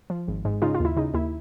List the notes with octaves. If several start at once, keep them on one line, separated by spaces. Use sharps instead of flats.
F3
G#1
G#2
C#3 D#4 F4
F4
D#2 E4
C#3 D#4
D#2 E4